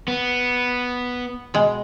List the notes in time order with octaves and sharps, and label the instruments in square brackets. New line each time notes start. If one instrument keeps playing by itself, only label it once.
[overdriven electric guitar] B3
[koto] B2 G#3